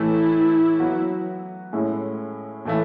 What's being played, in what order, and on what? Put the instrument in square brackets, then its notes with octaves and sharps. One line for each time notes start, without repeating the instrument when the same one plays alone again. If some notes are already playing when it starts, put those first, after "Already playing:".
Already playing: [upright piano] A2 E3 A3 [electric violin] E4
[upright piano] F#3 B3 F#4
A2 G#3 C#4 E4
A2 E3 A3 E4